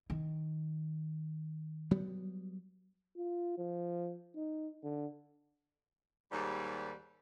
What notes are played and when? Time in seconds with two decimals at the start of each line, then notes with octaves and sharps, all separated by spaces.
0.10 D#3
1.91 F#3 G3 B3
3.17 F4
3.58 F3
4.36 D#4
4.83 D3
6.31 D#2 G#2 G3